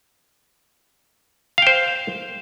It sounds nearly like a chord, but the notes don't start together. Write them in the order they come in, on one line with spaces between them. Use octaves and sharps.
F5 G5 C5